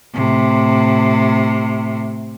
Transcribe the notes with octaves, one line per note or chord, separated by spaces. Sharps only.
A2 C3